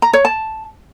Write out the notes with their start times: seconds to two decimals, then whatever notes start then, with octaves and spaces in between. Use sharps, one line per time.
0.02 A#5
0.13 C#5
0.25 A5